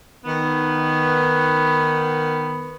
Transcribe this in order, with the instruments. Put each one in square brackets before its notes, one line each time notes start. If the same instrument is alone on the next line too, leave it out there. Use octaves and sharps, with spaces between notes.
[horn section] D#3 B3